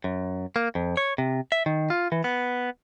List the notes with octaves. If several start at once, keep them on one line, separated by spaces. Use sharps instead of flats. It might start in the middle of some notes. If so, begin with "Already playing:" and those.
F#2
A#3
F2
C#5
C3
E5
D#3
F4
E3
B3